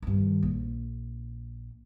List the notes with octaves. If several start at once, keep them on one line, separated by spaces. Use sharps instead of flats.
G2 D#3
A#1